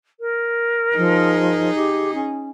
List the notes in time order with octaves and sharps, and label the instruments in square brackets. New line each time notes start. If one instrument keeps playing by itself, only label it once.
[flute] A#4
[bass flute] F3 [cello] D#4 G#4
[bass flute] G4
C#4